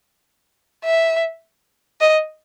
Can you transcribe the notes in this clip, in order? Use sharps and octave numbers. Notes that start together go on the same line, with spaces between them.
E5
D#5